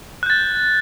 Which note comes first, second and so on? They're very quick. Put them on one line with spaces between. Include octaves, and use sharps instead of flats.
F#6 G6 A6